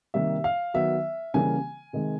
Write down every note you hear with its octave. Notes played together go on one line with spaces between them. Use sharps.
C3 D#3 G3 A#3 E5
F5
D#3 F#3 B3 E5
C#3 E3 G3 A#3 G#5
C3 D#3 G#3